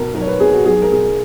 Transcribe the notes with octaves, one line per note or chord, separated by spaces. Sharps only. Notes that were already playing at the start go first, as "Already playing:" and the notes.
Already playing: B1 B2 A#4
B1 A#4
C#5
B4
B2 G#4
F#4
B1 G#4
A#4
B2 G#4